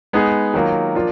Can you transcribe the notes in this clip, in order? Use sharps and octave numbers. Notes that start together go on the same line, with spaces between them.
G#3 B3 D#4 G#4
D#3 F#3 A#3 F4
F3 A#3 D4 F4